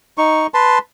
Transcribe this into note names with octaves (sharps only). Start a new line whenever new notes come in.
D#4 C#6
B4 A5 C6